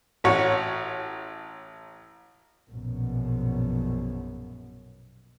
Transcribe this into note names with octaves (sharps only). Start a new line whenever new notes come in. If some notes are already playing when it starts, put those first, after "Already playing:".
A1 F#4 C#5
A#1 F#2 B2